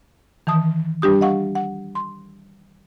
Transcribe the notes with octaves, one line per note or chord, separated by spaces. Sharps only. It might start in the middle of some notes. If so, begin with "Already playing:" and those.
D#3 E3 A5 D#6
G3 D4 G4 D#6
D#5 F5 F#5 C#6
F#5
C6